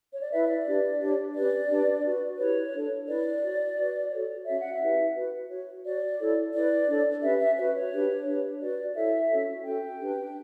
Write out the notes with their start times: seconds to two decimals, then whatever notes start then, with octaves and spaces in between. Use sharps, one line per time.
0.12 C#5
0.22 D5
0.31 E4 B4 E5
0.48 D5
0.66 D4 G4 B4
1.01 D4 G4 C#5
1.35 C#4 G4 B4 D5
1.69 D4 G4 B4
2.05 F#4 B4
2.38 E4 G4 B4 C#5
2.74 D4 A4 C#5
3.07 E4 B4 D5
3.42 F#4 C#5
3.77 F#4 B4
4.11 F#4 A4 C#5
4.46 C#4 F#4 C#5 E5
4.60 F#5
4.74 E5
4.81 E4 G4 B4
5.15 F#4 B4
5.50 F#4 C#5
5.85 F#4 C#5 D5
6.19 E4 A4 C#5
6.53 E4 B4 D5
6.87 D4 A4 C#5
7.22 C#4 G4 B4 E5
7.40 E5
7.57 F#4 B4 C#5
7.75 C#5
7.92 D4 G4 B4
8.26 D4 G4 B4
8.61 F#4 B4 D5
8.95 E4 A4 C#5 E5
9.30 C#4 F#4 A4 C#5
9.64 C#4 F#4 A4 G5
9.98 D4 G4 B4